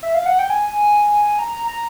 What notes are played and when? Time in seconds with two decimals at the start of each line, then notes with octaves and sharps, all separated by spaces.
0.03 E5
0.15 F5
0.26 F#5
0.39 G5
0.50 G#5
1.39 A#5
1.68 A#5